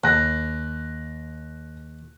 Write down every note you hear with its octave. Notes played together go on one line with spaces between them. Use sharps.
D#2 F#6 A#6